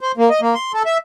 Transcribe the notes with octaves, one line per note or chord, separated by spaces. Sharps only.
C5
A#3
D#5
A#3
C6
A4
E5